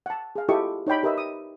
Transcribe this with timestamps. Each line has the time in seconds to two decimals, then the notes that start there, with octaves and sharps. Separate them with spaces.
0.06 F#5 A5
0.35 G#4 F5
0.49 E4 F4 G4 A4 D#5 C#6
0.87 D#4 C#5 D5 G5 B5
1.03 G4 A#4 B4 D#5 E5
1.18 D#6